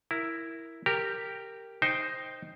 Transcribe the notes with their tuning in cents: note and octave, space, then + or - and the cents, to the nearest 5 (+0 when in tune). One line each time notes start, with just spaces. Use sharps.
E4 +0 A#4 +0
G4 +0 A#4 -15
D#4 +0 C5 +0 G5 +0